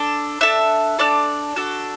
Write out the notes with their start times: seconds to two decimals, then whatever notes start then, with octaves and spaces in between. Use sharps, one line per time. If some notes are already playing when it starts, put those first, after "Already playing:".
Already playing: D4 A4
0.41 D4 A4 E5
0.99 D4 A4 D5
1.56 D4 F#4 A4